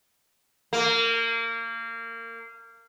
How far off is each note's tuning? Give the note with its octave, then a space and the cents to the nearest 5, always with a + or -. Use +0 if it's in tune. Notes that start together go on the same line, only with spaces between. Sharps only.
A#3 -25